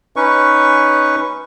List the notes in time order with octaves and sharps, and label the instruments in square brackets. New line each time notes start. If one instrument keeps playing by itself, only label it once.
[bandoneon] C#4 D#4 B4 C#6